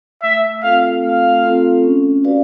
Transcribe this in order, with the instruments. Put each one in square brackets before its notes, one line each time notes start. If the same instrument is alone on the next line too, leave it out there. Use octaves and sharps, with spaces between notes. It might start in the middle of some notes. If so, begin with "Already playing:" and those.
[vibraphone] A3 [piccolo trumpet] E5
[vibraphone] C4 F4 A4 [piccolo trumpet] F5
[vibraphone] A3 [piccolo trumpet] F5
[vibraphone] C4 F4 A4
C#4
F#4 B4 D5 F5